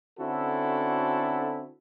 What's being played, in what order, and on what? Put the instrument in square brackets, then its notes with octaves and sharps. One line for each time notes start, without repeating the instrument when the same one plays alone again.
[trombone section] D3 C4 C#4 E4 F#4 A4